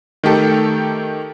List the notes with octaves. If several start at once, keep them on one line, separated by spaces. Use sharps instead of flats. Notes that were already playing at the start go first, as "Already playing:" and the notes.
D#3 A3 G4 A4